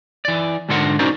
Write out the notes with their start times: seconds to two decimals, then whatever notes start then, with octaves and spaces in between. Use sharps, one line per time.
0.25 E3 D5
0.69 G#2 D3 D4 F4 A#4 F#5
0.99 C#4 D#4 F#4 A#4 C5 D5